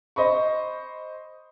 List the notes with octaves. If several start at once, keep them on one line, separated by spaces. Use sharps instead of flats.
C5 D#5 B5 C#6